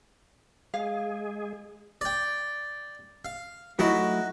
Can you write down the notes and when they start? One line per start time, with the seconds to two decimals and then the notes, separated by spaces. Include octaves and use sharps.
0.74 G#3 G#4 F5
2.01 D5 G5
3.25 F5
3.79 F#3 A3 D#4 E4 F#4